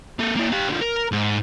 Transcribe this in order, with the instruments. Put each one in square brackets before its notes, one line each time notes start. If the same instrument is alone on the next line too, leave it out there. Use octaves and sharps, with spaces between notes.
[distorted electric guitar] A#3 A4
A#3 E4
G4 F5
D3 F3
A#4
G#2